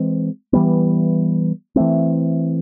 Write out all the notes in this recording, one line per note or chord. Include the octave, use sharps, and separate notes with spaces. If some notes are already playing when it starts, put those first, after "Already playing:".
Already playing: E3 G#3 C4
E3 G3 B3
E3 A3 C4